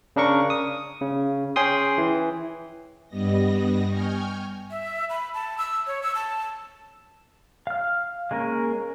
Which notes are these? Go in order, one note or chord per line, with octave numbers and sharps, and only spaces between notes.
C#3 D4 A#4 C#6
D#6
C#3
C#4 G#4 G5 C6 D#6
E3
G2 G3 B3 D#5 A#6
G5 G#5 C#6 F6 G6
E5
B5
A5
E6
C#5
E6
A5
F5 F6
G#3 A#3 C#4 A#4